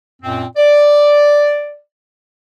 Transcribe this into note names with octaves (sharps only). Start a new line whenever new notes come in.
F#2 A#2 C4
D5